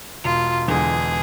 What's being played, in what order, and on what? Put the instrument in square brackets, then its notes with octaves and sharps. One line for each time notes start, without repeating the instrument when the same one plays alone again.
[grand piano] E1 [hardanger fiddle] F4
[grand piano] E2 D3 G#3 [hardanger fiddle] G#4